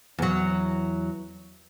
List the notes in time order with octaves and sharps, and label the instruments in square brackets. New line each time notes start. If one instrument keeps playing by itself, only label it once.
[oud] E2 F#3